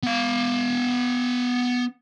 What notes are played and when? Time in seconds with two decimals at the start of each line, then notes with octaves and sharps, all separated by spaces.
0.03 B3 F5